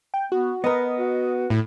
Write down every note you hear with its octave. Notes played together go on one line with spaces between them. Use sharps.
G5
B3 F#4
B3 A#4 B4 D#5
F#4
A2